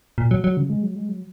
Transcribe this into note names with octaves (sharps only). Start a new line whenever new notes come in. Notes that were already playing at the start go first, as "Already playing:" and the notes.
A#2
F#3
F#3
C#3
G#3
F#3
G#3
F#3